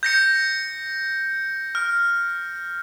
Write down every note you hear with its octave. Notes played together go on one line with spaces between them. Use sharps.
G6 A#6 C#7
F6